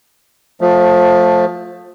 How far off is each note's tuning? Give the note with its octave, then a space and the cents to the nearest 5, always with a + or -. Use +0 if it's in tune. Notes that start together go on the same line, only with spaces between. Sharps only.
F3 +25 A3 +0